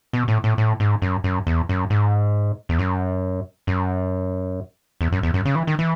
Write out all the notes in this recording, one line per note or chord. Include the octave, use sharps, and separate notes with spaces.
B2
A2
A2
A2
G#2
F#2
F#2
E2
F#2
G#2
E2
F#2
F#2
E2
F#2
E2
F#2
C#3
E3
D#3
E3